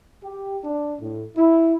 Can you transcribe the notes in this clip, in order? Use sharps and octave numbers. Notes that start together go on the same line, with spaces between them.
G4
D4
A2
E4